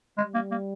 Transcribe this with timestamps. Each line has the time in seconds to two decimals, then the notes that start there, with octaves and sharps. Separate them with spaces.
0.17 G3 G#3
0.35 A#3
0.51 A#3